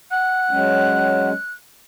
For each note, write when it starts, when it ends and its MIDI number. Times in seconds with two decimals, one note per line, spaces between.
0.11 1.30 78
0.11 1.52 90
0.51 1.33 54
0.51 1.33 56
0.51 1.33 61